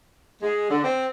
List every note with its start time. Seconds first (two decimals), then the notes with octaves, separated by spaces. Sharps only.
0.41 G#3
0.68 D3
0.83 C4